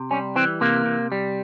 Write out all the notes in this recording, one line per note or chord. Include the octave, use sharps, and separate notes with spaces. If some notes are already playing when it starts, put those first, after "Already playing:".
Already playing: C3
G3 C#4
E3 C4
C3 A#3
C3
G3